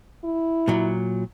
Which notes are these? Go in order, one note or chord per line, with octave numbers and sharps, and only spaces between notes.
E4
A#2 F#3